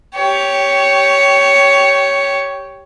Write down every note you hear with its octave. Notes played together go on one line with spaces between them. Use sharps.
G4 C#5